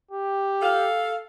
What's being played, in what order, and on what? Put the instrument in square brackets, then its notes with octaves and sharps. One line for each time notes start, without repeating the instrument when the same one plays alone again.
[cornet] G4
[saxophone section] A4 F5